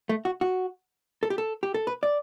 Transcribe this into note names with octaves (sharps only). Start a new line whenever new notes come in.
A3
F#4
F#4
A4
G4
A4
G4
A4
B4
D5